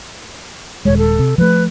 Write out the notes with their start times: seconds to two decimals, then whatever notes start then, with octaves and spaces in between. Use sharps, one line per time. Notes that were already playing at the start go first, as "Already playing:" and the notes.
0.85 D#1 G#3 C#5
0.97 A4
1.19 C3
1.38 F3 A3 B4